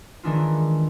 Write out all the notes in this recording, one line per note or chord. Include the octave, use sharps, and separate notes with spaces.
D#3 E3 G#3 D4 E4 F4